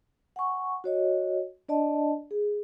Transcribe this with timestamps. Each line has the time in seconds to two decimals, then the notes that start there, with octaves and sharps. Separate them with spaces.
0.36 F#5 G#5 C#6
0.84 F#4 C#5 D#5
1.69 D4 D5 D#5 A5
2.31 G#4